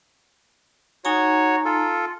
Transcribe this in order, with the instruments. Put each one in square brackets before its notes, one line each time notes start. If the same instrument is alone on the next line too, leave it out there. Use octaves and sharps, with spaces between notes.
[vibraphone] D#4 G#5 A#5 [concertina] F#4 C#5
[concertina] F4 A4